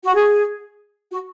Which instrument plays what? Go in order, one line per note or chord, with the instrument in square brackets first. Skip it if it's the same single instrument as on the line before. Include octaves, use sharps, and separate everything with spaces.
[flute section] F#4
G#4
F#4